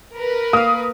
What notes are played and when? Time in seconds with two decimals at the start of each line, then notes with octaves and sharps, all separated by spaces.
0.16 A#4 B4
0.53 A#3 F5 D#6